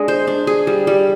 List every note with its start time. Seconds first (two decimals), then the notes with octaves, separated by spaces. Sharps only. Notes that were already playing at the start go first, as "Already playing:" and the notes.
Already playing: G#3 D4 G#4
0.08 C5
0.27 D4
0.47 G#4
0.67 G3
0.87 G3